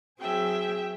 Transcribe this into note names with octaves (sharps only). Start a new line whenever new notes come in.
F#3 C4 G#4 E5 G5